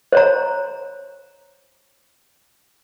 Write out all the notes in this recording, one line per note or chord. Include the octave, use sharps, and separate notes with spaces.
C5 C#5 A#5